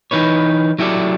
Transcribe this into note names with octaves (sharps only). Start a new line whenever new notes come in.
E3 D#4 B4 C#5
F#3 E4 G4 A4 D5